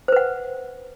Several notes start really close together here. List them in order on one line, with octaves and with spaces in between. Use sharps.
C5 B4 F#5